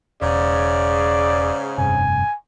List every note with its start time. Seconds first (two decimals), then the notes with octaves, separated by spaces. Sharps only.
0.22 E1 G#2 C#3 D5
1.78 F1 G2 C3 G#5